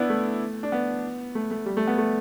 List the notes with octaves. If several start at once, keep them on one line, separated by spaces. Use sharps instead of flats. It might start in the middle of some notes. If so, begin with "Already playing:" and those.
Already playing: B3 D4 E4
A3
D4
B3
A3
A3
G3
A3
B3
A3